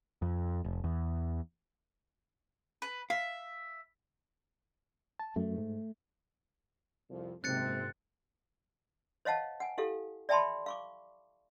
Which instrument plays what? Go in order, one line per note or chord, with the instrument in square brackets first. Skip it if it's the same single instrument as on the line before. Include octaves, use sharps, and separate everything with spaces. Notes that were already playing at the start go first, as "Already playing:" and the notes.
[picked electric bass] F2
F1
E2
[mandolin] B4
[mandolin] E5 [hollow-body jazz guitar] F5
[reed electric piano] A5
[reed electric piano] F#2 [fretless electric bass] A3
[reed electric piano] G#2
[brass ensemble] C2 F2 F3
[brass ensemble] F#1 C4 [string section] G#2 C3 [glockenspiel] F#6 A6 C#7
[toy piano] C5 C#5 D#5 F5 F#5 A5
F#5 G#5
E4 G4 A4 F5
D5 E5 G5 A5 B5 C6
F5 C#6 D6